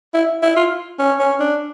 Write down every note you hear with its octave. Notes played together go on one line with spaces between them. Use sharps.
E4
E4
F4
C#4
C#4
D4